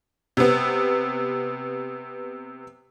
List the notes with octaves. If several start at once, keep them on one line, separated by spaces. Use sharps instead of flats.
C3 B3